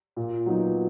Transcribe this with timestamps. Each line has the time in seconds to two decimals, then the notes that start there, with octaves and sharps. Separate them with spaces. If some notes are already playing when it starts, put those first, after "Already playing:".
0.16 A#2
0.46 F#3 B3 D#4